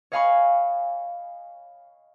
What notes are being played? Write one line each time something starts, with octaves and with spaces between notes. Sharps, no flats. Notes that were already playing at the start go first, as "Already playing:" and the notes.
C#5 D#5 F5 G#5 B5 C#6